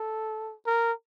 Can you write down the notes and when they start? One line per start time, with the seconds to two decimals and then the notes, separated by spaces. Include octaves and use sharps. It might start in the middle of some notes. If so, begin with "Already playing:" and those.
Already playing: A4
0.66 A#4